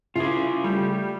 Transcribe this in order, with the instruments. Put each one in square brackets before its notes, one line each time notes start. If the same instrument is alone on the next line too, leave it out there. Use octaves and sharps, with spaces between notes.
[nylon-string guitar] C#3 [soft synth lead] E4 [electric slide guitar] F4 G#4
[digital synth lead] G3 [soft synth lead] A3